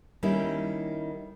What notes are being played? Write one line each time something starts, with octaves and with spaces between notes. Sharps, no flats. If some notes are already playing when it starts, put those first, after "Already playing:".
D#3 G3 A#3 C#4 D#4 E4